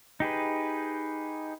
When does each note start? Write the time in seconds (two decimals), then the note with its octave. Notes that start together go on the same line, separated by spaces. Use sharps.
0.20 D#4 G4 G#4 B4